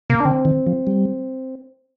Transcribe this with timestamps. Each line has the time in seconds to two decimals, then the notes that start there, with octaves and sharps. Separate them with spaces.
0.10 C3 A#3
0.20 D4
0.25 D3 C4
0.45 D#3
0.67 F3
0.87 G3